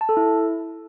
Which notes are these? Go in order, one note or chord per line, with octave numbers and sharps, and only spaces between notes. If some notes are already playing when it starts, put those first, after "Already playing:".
A5
A4
E4